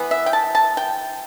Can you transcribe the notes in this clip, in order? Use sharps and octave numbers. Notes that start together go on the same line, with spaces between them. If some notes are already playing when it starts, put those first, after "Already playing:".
Already playing: E3 B3
E5
G5
A5
A5
G5